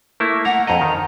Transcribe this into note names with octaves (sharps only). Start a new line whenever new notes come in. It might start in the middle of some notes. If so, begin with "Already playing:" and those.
A3 A#3 E4
F#5 A#5
F2 D#5 A#5
D#3